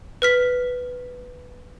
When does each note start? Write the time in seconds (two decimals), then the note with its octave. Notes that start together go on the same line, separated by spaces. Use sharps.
0.22 B4 F6 B6